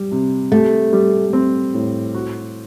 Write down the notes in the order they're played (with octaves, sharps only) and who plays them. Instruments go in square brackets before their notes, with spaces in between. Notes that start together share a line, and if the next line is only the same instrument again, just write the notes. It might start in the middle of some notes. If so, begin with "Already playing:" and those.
Already playing: [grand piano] G3
C3
[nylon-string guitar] A3 [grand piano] G4
[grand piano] G3
C4
A2
F#4